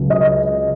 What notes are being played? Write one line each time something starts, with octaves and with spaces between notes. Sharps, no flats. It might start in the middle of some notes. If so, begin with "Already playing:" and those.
Already playing: C#2 C#3 F#3
D#5